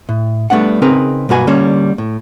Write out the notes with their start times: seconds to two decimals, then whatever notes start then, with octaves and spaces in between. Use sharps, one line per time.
0.09 A2
0.50 G3 A3 B3 D4 F#5
0.82 C#3 C4 D#4 G#4 A#4 B4
1.29 B1 G2 A#3 F#4 B4 G#5
1.47 D3 G3 A#3 C#4 C#5
1.98 A2